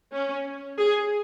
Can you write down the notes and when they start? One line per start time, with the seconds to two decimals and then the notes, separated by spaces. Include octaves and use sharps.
0.12 C#4
0.79 G#4